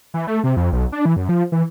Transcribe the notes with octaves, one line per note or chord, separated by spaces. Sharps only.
E3
A3
C3
F2
B1
D4
E3
F#2
F3
E3